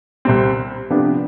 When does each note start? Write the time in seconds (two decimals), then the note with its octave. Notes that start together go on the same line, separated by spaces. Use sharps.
0.25 C2 C3 G3 C4
0.90 C3 F3 B3 D4 G4